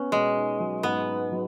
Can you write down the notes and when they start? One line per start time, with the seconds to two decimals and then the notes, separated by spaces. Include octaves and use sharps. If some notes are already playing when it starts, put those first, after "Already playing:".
Already playing: B3 C#4
0.12 B2 G#3
0.37 D#4
0.60 F#3
0.83 G#2 B3
1.08 D#4
1.32 F#3